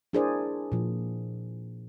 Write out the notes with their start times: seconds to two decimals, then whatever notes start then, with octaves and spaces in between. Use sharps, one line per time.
0.13 D4 E4 G#4 A#4 C5 D5
0.72 A#2 F3